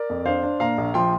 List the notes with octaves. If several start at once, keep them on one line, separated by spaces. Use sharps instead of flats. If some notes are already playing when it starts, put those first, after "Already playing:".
Already playing: A#4 D5
F2
D4 C5 F5
D4
A#2 F5 A#5
A#1
F3 G5 C6